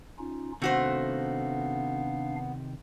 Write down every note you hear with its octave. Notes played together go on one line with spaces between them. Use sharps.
C#4 D#4 F4
C3 D#3 A3 B3 D4 F#4 C5 F5